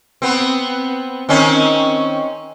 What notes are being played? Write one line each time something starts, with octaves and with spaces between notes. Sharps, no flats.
B3 C4
D#3 C4 C#4